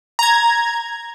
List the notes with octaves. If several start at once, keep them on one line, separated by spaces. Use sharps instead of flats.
A#5 G#6